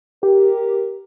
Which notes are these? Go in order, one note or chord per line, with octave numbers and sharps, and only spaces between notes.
G4 A#4